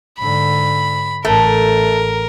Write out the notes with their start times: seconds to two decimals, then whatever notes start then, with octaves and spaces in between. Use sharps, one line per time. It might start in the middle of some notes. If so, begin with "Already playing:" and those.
0.19 G#2 D3 B5
1.25 A1 A3 A#4